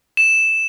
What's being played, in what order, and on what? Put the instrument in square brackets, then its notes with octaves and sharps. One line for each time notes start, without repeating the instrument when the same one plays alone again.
[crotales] E7